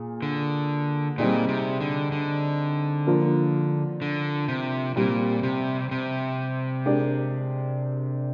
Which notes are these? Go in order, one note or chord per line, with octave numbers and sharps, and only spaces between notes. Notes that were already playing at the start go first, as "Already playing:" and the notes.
Already playing: A#2 G#4
D3
A#2 G3 C4 D#4 G#4 D5
C3
D3
D3
F3 A#3 D4 F4 A#4
D3
C3
A#2 G3 C4 G4
C3
C3
G#3 D4 G4 A#4 D5